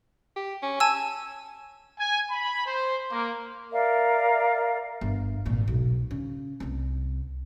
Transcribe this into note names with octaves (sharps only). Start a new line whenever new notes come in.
G4
C#4
G#5 A5 E6
G#5
B5
C5
A#3
A#4 D5 E5 F5
G1
G#1 A#2
B1
C#3
C2 C4